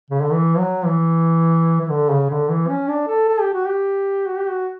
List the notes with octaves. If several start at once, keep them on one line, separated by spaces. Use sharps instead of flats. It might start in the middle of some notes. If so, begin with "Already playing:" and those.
C#3
D3
E3
F#3
E3
E3
D3
C#3
D3
E3
C#4
D4
A4
A4
G4
F#4
G4
F#4
G4
F#4